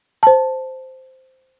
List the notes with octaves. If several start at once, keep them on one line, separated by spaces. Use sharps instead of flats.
C5 A5